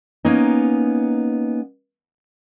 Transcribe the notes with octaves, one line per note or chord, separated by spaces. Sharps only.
A#3 B3 C#4 D#4